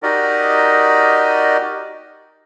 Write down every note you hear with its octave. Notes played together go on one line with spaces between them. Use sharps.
D#4 F#4 G4 A#4 D5 D#5